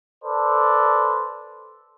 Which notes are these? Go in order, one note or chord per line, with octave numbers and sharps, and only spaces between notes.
A4 B4 C5 D5